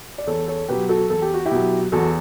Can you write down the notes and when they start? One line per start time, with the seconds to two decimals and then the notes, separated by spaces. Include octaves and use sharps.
0.18 D5
0.27 E2 A4 C#5
0.48 A4 C#5
0.68 B2 F#3 G4 B4
0.89 F#4 A4
1.10 E2 A4
1.22 G4
1.34 F#4
1.46 E4 G4
1.51 B2 F#3
1.92 E2 F#4 A4